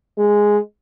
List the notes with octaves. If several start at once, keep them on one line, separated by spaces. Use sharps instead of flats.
G#3